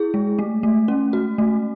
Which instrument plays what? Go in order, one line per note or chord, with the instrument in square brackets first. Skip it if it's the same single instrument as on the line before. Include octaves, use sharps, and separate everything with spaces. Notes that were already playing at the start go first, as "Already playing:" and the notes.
Already playing: [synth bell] E4 G#4
G#3
A3
A3
C#4
F#4
A3